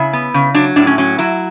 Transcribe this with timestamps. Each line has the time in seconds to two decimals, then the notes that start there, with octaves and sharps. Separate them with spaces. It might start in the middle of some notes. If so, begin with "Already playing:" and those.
Already playing: C#3 E4
0.13 B3
0.34 C#3
0.54 F#3 D4
0.76 A2 D4
0.87 C#4
0.98 F#3 C#4
1.18 F#3 E4